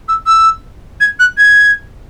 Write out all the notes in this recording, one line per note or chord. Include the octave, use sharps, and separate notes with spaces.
E6
E6
G#6
F#6
G#6